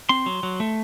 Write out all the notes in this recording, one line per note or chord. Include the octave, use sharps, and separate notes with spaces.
C4 C6
F#3
F#3
A3